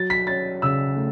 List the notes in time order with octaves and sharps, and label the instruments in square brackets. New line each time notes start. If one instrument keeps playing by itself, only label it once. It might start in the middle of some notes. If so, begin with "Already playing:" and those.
Already playing: [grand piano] F#3 A6
B6
C#4 A6
C#3 E6
A3